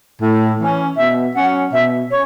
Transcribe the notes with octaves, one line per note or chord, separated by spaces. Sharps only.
A2
E3 C#4
B2 E5
F#3 C#4 F#5
B2 E5
C#4 C#5